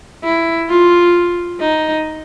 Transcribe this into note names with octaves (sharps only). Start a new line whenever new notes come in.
E4
F4
D#4